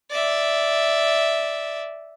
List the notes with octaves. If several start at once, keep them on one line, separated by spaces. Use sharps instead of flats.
D5 E5